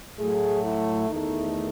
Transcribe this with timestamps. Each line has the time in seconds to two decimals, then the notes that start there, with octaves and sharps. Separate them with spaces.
0.19 A2 F#3 A3 G#4
0.64 E4
1.09 E2 D#3 A3 D#4